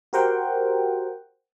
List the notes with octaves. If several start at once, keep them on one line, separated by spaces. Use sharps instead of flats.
F#4 G4 A#4 C5 F#5 G5